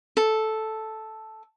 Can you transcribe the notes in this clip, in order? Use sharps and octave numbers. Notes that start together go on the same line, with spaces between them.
A4